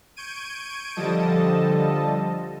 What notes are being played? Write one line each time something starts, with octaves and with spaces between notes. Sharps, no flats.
C#6 G6 G#6 D7 D#7
D3 F3 G3 A4 D#5 A5